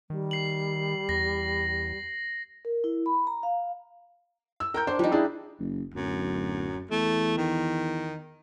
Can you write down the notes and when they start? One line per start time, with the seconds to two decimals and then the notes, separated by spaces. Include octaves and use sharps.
0.10 D#3 G3
0.31 C7 F#7
1.09 E2 A#6
2.65 A#4
2.84 E4
3.06 B5
3.27 A#5
3.43 F5
4.60 E6
4.74 A#4 G5 A#5 G6
4.87 D4 C5
4.99 F3 G3 D#4
5.12 D4 E4 G#4
5.59 F#1
5.95 D1 F#2
6.91 E2 A3
7.38 D#3